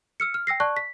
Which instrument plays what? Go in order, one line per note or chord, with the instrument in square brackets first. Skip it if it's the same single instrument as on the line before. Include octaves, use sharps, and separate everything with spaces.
[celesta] E6 F6 C#7
F6
G5 E6 A#6 C7
D5 A5 C#6 F#6
B6